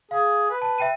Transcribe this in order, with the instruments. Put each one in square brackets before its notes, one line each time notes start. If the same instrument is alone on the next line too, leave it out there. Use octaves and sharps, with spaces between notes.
[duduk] G#4 [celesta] F5
[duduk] B4
[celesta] A5
E5 G5 D#7